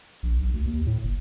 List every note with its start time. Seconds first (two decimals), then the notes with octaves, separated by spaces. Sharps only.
0.23 A#1
0.39 B1
0.54 D2
0.66 D#2
0.87 A2
1.04 F#1